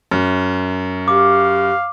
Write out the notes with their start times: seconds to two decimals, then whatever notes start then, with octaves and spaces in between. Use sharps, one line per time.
0.11 F#2
1.08 G4 F5 D6